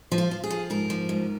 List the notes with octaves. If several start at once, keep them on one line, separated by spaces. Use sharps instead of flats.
F3
F4
F3
G#4
F3
G#2 A#4
F3
G#2